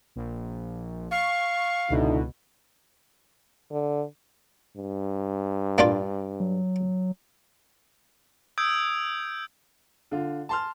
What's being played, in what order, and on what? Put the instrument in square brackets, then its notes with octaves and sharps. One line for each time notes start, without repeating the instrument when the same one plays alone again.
[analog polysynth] A#1
[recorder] F5 [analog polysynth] C#6
[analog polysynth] C#2 B2 [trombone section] D3 D#4 E4
[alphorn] D3
[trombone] G2
[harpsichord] A#3 D4 F4
[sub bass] F#3
[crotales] D#6 E6 G6 G#6 D7
[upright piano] D3 F4
A5 C6 F6